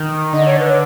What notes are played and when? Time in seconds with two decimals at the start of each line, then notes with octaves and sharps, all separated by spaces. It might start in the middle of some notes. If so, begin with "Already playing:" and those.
Already playing: D#3
0.32 D3 D#5
0.46 C#5
0.60 B4